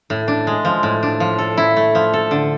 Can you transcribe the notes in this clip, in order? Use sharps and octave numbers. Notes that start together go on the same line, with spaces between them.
A2
D4
G#3
F3
A2
D4
F3
A4
E4
A3
F3
A4
D3